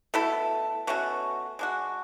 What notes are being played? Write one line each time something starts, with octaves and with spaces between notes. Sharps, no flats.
B2 A3 E4 A4
B2 A3 C#4 F#4
G#3 D4 F#4